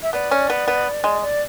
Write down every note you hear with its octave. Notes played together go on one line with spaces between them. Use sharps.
E5
B3 D5
C#4
B3
B3
G#3
D5